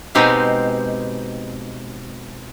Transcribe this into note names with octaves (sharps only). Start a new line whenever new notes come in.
B2 G#3 C4 D#4 G4 F5